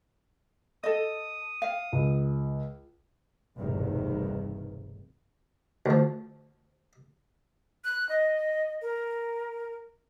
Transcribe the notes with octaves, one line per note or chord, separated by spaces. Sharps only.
A4 D#5 D#6
F5
C#2
F1 A#1 E2 G2 B2 D#3
D2 F3
F#6
D#5
A#4